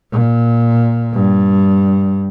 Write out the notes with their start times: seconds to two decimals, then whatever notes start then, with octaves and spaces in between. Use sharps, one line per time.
0.12 A#2
1.13 G2